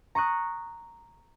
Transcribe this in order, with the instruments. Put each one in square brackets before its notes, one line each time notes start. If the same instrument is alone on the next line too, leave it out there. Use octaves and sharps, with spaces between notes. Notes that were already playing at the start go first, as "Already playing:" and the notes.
[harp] A#5 C#6 D#6 F#6